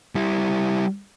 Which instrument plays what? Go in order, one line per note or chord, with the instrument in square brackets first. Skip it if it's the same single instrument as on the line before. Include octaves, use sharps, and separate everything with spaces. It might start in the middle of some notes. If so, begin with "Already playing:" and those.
[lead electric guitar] G3 E4